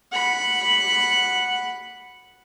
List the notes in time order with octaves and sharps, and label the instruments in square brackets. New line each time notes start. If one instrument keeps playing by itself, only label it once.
[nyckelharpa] F#5 B5